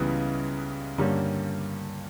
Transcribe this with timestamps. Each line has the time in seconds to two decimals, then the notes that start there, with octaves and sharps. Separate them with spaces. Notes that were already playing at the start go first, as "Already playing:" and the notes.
Already playing: C#2 C#3 E3 G3 B3
0.98 G2 D3 G3 A#3 C#4